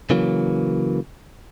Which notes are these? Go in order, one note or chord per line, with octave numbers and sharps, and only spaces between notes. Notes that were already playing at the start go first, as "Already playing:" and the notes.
C#3 E3 F#3 A#3